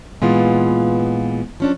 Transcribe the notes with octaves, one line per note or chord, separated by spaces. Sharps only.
A#2 E3 G#3 B3 F4
F3 C#4 D4